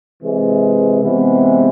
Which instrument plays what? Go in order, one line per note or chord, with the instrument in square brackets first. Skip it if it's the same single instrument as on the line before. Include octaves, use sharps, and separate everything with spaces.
[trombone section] C3 E3 G#3
C3 E3 G#3 B3